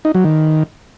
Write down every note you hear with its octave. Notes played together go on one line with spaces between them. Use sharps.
D#4
F#3
D#3